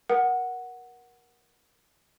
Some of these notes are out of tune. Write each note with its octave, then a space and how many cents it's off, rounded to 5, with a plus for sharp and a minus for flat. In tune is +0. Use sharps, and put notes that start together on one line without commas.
A#4 +25 F#5 +0